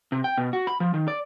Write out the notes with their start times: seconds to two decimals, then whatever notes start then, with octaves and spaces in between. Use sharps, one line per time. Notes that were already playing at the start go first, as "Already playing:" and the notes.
0.12 C3
0.24 G5
0.38 B2
0.53 F#4
0.67 B5
0.80 F3
0.94 D#3
1.08 D5